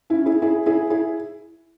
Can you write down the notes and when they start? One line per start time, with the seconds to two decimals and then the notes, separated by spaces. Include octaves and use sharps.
0.10 C#4 E4
0.26 E4 G#4
0.42 E4 G#4
0.66 E4 G#4
0.90 E4 G#4